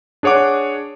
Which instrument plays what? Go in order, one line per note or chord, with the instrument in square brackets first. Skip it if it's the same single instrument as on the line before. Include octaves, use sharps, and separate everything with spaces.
[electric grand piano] D4 G#4 C#5 F#5 D6